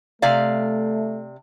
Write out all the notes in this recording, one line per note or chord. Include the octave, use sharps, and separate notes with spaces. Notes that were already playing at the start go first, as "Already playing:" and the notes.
C3 A3 D5 F5